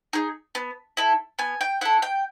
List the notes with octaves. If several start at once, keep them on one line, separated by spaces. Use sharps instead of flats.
D#4 G#4
B3
E4 A4
B3 G#5
G5
E4 A4 F#5
G5